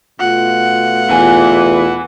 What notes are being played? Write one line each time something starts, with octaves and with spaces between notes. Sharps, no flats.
B2 A3 F4 F#5
E2 E3 G#5